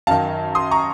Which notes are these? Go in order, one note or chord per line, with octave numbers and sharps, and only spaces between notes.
F#2 D#3 F5 A5
C6 D#6
A#5 C#6